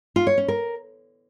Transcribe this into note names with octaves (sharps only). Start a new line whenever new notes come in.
F4
C#5
C#4
A#4